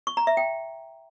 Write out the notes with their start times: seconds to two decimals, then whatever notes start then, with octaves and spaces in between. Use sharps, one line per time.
0.07 C#6
0.17 A#5
0.27 E5
0.37 G5